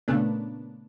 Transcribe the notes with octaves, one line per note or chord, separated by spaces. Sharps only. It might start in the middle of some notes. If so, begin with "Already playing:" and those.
A#2 C#3 A3 B3 D4